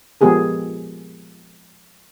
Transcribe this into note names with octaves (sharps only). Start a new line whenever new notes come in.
F3 G#3 B3 G4 G#4 A#4